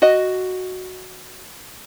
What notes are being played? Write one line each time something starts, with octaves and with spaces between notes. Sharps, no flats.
F#4 D#5